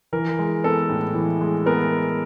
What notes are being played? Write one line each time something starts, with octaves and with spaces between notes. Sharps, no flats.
E3 A#4
G#3
B3 A4
A2
E3
G#3
B3 A#4